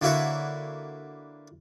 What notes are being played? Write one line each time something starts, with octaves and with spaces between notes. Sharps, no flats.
D3 A#3 E4 F#4 B4 C#5